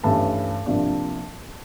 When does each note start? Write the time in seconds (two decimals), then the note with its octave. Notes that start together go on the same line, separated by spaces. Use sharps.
0.04 G2 E3 A3 C#4 A5
0.66 C3 F3 A#3 D4